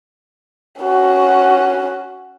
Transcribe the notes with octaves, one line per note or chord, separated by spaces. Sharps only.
C#4 F#4